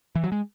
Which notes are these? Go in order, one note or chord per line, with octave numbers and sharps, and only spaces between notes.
E3
F#3
G#3